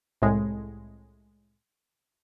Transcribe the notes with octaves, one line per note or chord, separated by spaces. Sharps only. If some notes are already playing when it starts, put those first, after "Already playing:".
C2 A2 G#3